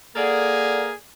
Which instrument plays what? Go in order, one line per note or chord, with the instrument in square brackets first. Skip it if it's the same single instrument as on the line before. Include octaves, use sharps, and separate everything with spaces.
[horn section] A#3 G#4 [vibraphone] A4 D5 F#5